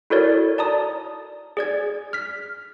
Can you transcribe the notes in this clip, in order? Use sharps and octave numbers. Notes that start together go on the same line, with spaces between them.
E4 F#4 A4 A#4 C#5 D5
D5 A5 A#5 D#6
G#4 D5 G#6
F6 B6